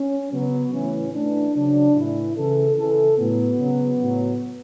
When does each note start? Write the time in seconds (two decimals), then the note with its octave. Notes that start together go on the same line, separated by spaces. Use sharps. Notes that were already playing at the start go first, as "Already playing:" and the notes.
Already playing: C#4
0.32 C#3 F#3 B3
0.72 A2 E3 C#4
1.13 A2 E3 D4
1.54 C#3 F#3 D4
1.95 A2 E3 E4
2.35 C#3 E3 A4
2.76 C#3 E3 A4
3.17 A2 F#3 B3
3.58 C#3 F#3
4.00 A2 F#3